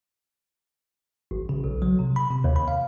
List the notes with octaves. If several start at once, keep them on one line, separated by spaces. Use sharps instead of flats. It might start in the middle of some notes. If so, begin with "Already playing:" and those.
G#1
C#3
B1
F#3
C3
B5
C3
D#2
B5
F5